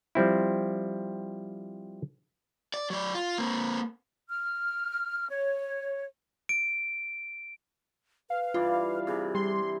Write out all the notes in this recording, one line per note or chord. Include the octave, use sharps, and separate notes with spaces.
F3 G3 C4 E4
D5
F#3 D5
F4
A#3 C4
F6
C#5
D7
B4 F5
G2 E3 F4 D5
C3 E3 G4 G#4
G3 C6